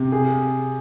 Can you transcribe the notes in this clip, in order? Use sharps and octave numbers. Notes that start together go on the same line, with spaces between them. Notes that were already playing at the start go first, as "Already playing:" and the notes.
Already playing: C3
G#4